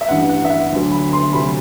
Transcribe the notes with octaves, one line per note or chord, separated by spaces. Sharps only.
E5
A1 G2 E3 F#5
F#5
E5
F#5
D2 D3 F#3
B5
C6
D2 C3 F#3 B5